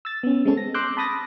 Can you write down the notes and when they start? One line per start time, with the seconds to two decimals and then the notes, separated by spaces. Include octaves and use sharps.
0.05 E6 A6
0.23 B3 C#4
0.45 G#3 C4 C#4 A4
0.57 A#6
0.74 C6 D6 E6 F#6 G6
0.97 A5 B5 D#6 A6 A#6